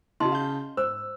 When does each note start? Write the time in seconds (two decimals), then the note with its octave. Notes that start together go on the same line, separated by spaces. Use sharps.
0.20 C#3 E4 F#4 D#5 A5 C6
0.32 F5 G6
0.77 G#2 C5 E6